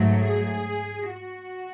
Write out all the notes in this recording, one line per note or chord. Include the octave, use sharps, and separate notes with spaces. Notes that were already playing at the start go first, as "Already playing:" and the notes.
Already playing: G#2 F#3 A3
G#4
F#4